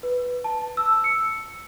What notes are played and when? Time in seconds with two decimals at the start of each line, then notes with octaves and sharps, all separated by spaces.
0.03 B4
0.44 A5
0.77 E6
1.04 C#7